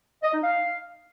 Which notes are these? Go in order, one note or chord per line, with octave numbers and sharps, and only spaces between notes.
D#5
D#4
F5